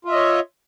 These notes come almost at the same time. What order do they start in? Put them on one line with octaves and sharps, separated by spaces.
F4 E5 D#5 C#5